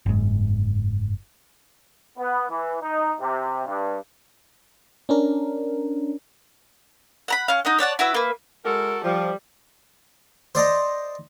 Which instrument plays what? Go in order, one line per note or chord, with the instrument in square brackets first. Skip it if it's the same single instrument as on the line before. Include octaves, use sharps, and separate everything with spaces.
[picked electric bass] F#1 G#2
[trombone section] B3
E3
D#4
C3
G2
[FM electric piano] C#4 D4 A#4
[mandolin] F#5 A#5 B5
C#4 F5
D#4 D#5 F#5
C#5 D5 F#5 A5
E4 F#4 B4 E5
A#3 B4
[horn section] G#3 F#4 A#4 [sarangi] A4
[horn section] F3 [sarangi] G3
[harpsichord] C5 D5 D#5 A#5